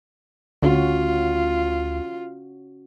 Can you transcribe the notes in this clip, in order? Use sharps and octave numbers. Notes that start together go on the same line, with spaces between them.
D2 C#4 F4 F#4